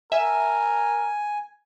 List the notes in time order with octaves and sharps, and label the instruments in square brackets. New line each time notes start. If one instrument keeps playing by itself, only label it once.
[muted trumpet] A#4 [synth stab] E5 [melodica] G#5